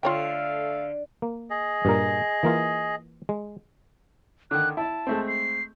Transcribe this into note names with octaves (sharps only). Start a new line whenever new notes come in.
D3 A3 F4 A4 C#5 F5 G5
A#3
G#4 D#5
G2 A#2 A#4
E3 A#3 F4
G#3
D3 D#3 F#6
E4 A5
G#3 A3 C4
C7